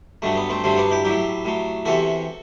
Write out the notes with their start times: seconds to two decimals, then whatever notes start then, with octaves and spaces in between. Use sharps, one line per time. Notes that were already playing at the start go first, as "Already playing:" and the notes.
0.22 G2 D3 F#3 A3
0.36 B3
0.49 A3 C4
0.64 G2 D3 F#3 A3 C4
0.76 B3 D4
0.90 E4 G4
1.04 A2 F#3 E4 G4
1.45 A2 F#3
1.85 E2 C3 E3 F#4 A4